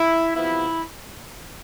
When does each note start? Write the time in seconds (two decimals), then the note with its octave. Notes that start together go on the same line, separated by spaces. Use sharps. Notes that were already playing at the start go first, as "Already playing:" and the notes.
Already playing: E4
0.36 C3 F3 B3 E4